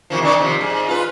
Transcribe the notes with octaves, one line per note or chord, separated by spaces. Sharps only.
C3 D#3 F3
D#3 D4 D#4
C3 F3
G#2
F4 B4